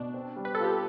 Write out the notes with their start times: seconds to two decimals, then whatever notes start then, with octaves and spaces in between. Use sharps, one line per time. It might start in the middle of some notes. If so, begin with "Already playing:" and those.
Already playing: B2 D4
0.14 C4
0.36 G3
0.45 B4
0.55 A4
0.60 F4 G4